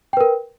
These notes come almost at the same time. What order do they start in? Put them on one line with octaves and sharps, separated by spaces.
G5 B4 A#4